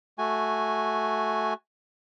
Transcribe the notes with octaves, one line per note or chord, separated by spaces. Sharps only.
A3 F#4 G#5